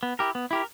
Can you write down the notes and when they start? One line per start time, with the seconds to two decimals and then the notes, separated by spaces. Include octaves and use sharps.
0.03 B3
0.19 E4 G4 A#4
0.35 B3
0.51 E4 G4 A#4